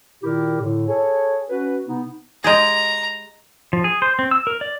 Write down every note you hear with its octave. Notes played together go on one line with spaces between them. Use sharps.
A#2 D#3 E4 G4 A#4
A2 D3
G#4 A4 C#5
C#4 F#4 B4
C3 B3 D#4
G#3 G4 G#4 A#5
F3
G#4
C5
C4
E6
A#4
D5